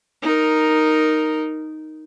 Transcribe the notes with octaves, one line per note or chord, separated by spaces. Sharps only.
D#4 A#4